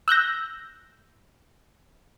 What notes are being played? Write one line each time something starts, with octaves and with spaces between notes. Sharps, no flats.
E6 F#6 G6 A#6